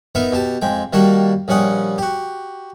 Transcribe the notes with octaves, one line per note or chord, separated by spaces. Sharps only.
B3 D#4 A#4 E5
B2 G4 A5
F2 G#3 G5
D#3 G3 A#3 F#4 A5
A#1 G3 C#4 F#5 D#6
F#4 G4